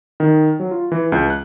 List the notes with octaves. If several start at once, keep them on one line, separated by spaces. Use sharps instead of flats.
D#3
F#3
F4
E3
C#2
F#6